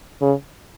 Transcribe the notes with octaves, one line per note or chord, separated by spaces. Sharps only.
C#3